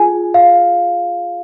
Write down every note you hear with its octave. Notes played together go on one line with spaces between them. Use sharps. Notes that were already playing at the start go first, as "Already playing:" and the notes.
Already playing: F4 G#4 G#5
F5